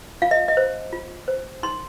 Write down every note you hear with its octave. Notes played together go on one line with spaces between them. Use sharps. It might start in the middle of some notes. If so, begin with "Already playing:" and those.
F4 F5
D#5
D#5
C5
F4
C5
D#4 C6